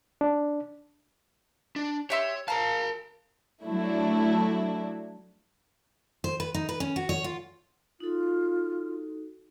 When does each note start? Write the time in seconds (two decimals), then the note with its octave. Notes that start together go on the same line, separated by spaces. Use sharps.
0.21 D4
1.76 D4
2.10 G4 C#5 E5 C6
2.48 A#4 F5 A5 A#5
3.63 F#3 A3 D4 E4
6.24 C5
6.40 B4
6.54 D#4
6.69 B4
6.80 C#4
6.96 F#4
7.09 C#5
7.24 F4
8.00 D#4 F4 F#4 A4